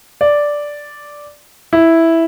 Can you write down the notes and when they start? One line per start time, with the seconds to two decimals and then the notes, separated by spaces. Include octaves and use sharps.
0.21 D5
1.73 E4